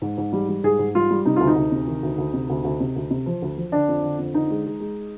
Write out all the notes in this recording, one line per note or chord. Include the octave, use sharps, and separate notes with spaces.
G#2
G#2
G3
G3
G#2 G#4
G#2
G3 F4
G3
C3 D#4
D2 F4
D#4
D2
C3
D#3
D2
D2
C3
D2
D2
C3
D2
C3
F3
D2
F3
D3 D4
F2
D3
F2
D3 D#4
G#3
G#3
G#3